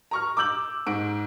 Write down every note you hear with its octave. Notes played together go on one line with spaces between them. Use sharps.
A#5 C#6 F6
D6 E6 G6 F#7
G#2 D7